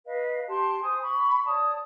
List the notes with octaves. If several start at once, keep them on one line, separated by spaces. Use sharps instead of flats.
B4 D#5 F5
G4 A5 C6
C5 G#5 D#6
B5 C#6
C#5 D5 A5 D#6